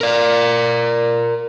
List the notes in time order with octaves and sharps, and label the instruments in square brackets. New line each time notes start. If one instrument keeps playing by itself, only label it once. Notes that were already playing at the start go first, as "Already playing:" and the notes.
[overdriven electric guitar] A#4 D5